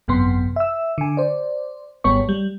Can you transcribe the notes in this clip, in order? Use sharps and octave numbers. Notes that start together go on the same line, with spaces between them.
G#1 F#2 C3 B3 C6
E5 E6
D3 G#5
C5 D5
G#1 G3 B3 C#5 C#6
G3